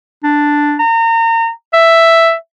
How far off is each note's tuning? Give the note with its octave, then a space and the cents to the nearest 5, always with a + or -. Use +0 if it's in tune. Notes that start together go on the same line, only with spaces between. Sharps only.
D4 +0
A#5 -35
E5 +5